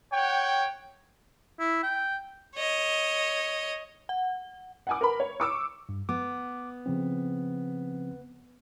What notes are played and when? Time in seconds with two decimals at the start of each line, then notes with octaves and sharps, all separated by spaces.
0.13 C#5 F#5 G5
1.60 E4
1.83 G5
2.55 C#5 D#5
4.09 F#5
4.87 F#5 G#5 D6
5.01 A#4 B4 B5
5.20 C#5
5.40 C#6 D6 E6
5.89 G2
6.09 B3 D6
6.86 C#3 F3 C4